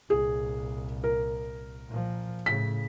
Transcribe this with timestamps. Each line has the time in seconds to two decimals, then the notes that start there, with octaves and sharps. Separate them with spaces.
0.10 C2 A#2 G#4
1.04 A#4
1.88 A#2 F3
2.46 A2 C#3 B6